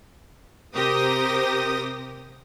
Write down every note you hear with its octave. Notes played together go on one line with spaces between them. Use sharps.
C3 G4 A#4 C5 D#6 A#6